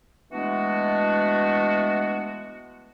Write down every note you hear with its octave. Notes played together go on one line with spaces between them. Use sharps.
E3 G#3 A3 B3 D4 F#4